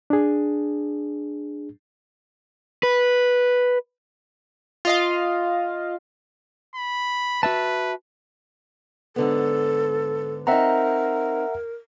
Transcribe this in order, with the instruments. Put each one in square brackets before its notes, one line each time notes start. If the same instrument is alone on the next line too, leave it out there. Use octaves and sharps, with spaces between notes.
[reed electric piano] D4 G#4
[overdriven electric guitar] B4
[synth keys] F4 D#5 F5
[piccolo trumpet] B5
[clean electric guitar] F#4 E5 A5 [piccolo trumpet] B4
[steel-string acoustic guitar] G#2 D3 B3 [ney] A4
[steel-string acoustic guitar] C4 D#4 [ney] A#4 [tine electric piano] E5 F#5 A#5